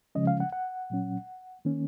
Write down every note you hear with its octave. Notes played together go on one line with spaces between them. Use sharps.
C#3 F3 G#3 C#4 D#5
F5
F#5
F#5
A#2 F#3 C#4
D#3 A#3 C#4